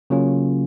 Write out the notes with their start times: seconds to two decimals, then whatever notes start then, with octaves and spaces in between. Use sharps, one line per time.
0.10 C#3 F#3 A#3 C#4 F4